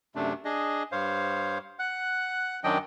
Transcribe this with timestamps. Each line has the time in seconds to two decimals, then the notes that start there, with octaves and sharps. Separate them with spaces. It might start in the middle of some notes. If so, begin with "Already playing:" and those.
0.15 F#2 C3 A3 D4
0.45 D4 G#4 D#5
0.92 G2 C5 C#5 F5
1.79 F#5 F#6
2.64 F#2 D#3 F#3 D4 D#5 G5